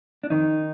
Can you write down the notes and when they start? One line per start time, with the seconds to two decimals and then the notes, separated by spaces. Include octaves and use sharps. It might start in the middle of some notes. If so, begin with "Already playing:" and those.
0.24 D4
0.30 F2 D#3 D#4